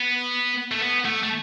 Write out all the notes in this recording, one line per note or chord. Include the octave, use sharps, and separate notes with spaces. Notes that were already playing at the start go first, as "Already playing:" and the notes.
Already playing: B3
A3
B3
A3
A3